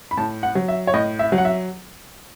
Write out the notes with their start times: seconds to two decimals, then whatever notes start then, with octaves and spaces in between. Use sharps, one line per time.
0.11 B5
0.17 A2 A5
0.43 F#5
0.55 F#3
0.68 E5
0.87 C#5
0.94 A2 D#5
1.19 E5
1.32 F#3
1.38 F#5
1.45 E5